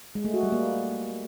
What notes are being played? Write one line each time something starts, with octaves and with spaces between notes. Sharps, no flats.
G#3
A3
F#4
G3
A#3